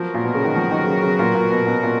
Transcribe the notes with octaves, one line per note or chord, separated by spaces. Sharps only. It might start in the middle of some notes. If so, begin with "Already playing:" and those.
Already playing: F3 F#3 B3 F#4 A#4
A#2
B2
C#3
D#3
F3
D#3
C#3
C#3
A#2
A#2
B2
B2
A#2